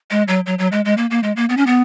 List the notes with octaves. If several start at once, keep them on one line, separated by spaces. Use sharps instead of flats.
G#3
F#3
F#3
F#3
G#3
G#3
A#3
A#3
G#3
A#3
B3
C#4
B3